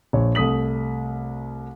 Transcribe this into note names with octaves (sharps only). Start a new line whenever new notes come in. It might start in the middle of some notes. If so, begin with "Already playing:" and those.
A#1 C#5
C2 A3 D#6 B6 F#7